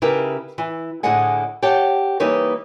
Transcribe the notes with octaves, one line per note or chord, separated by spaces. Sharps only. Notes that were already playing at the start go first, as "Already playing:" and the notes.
C#3 D#4 E4 G4 A#4 B4
E3
A2 D3 G#4 D#5 F#5 G#5
G4 C#5 F#5 G5 A5
E3 G3 A#3 D#4 B4 C#5